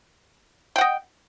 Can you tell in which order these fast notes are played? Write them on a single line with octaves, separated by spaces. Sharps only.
G5 F#5 D#5